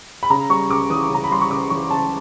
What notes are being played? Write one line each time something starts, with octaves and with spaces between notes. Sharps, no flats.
B5
C#3 A#5
G3 C#6
C#2 D6
E3 D#6
C#3 A#5
B5
G3 C6
C#6
C#2 D6
E3 C#6
C#3 A5